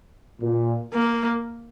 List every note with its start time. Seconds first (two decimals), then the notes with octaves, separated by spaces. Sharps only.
0.41 A#2
0.94 A#3